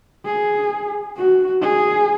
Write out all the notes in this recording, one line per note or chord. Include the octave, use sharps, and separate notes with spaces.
G#4
F#4
G#4